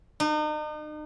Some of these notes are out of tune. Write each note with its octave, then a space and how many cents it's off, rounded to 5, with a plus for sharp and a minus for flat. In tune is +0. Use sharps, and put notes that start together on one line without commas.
D#4 -40